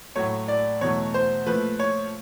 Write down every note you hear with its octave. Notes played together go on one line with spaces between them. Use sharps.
A2 F#3 A3 C#5
D5
E2 B2 F#3 A3 C#5
C5
A#2 F3 A3 B4
C#5